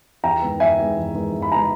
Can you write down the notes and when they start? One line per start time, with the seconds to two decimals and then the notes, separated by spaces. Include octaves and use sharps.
0.23 E2 G5 A#5
0.42 D#3 G#3 B3
0.60 E2 E5 G#5
0.78 D#3 G#3 B3
0.96 E2
1.15 D#3 G#3 B3
1.32 E2
1.42 B5
1.51 D#3 G#3 B3 A#5